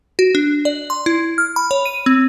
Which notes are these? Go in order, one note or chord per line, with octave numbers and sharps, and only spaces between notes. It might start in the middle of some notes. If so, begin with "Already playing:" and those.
F#4
D4
D5
C6
E4
F6
B5
C#5
D#7
C4